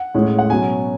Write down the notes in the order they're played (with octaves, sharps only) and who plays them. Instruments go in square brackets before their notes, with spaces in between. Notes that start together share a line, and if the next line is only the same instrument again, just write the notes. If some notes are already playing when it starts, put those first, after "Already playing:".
Already playing: [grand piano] F#5
A2 G#3 C#4
F#5
B2 F#3 C#4 G#5